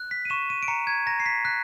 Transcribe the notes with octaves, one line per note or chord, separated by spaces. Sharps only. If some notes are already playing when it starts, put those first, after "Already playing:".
Already playing: F#6
B6
D#7
C#6 E7
D#7
D7
A#5 C#7
G#6
A#5 A#6
C7
B6
F#6 B6